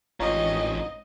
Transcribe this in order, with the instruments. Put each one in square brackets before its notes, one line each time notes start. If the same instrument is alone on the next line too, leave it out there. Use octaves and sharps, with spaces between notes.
[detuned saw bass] A1 [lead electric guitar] G#2 C4 [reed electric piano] F4 C#5 A#5 [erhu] D#5